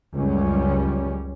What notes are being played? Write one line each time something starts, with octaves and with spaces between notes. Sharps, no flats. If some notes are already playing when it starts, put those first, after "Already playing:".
C#2 F#2 G3 C#4